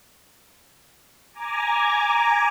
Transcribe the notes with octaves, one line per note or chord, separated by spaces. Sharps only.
G#5 A#5 D6